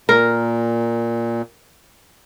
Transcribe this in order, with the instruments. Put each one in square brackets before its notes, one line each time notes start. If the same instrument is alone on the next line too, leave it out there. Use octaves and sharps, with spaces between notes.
[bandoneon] A#2 [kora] A#4